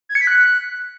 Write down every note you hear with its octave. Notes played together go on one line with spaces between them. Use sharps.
G#6
C#7
B6
F#6